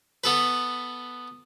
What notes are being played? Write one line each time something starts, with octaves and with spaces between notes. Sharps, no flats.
B3 A4 B4